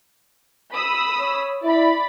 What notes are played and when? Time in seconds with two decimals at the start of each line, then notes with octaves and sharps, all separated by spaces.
0.73 B5 D#6 E6
1.20 C#5
1.63 E4 D5 B5